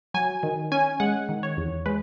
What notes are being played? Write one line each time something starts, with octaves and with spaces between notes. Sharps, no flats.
F#3 G#5
D#3
C#4 G#5
G#3 F#5
D#3
C#5
E2
G#3 B4